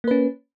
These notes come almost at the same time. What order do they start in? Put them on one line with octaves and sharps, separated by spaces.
A#3 B4 C#4